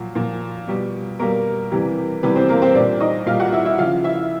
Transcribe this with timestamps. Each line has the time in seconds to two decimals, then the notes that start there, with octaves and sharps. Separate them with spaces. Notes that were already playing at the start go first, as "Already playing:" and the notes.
Already playing: A#2 F3 F#3 F#4
0.15 A#2 F3
0.67 B2 G3
1.19 B2 G3 A#3 A#4
1.71 C3 E3 G3
2.23 C3 E3 G3 B3 B4
2.36 C4 C5
2.49 A#3 A#4
2.62 C4 C5
2.75 A#2 G3 D4 D5
3.00 D#4 D#5
3.26 A#2 G3 F4 F5
3.39 F#4 F#5
3.53 E4 E5
3.65 E4 E5
3.78 C#3 F3 F4 F5
4.04 E4 E5